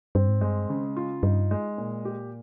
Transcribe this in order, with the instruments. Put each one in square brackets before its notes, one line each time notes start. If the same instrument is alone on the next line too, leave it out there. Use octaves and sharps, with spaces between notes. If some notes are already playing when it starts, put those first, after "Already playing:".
[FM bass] G2 [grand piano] C4
[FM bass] G#2
[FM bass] G2 [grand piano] G#3
[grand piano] C#3
F4
[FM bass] G2 [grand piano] D#4
[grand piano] G#3
A#2
G4